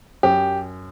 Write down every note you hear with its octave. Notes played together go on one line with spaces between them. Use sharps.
F#2 G4